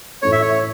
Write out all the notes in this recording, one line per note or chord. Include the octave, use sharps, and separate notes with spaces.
A2 E3 A3 C#5
E5
C#5